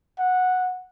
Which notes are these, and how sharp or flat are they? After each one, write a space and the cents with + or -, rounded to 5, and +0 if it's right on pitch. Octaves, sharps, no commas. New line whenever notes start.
F#5 -10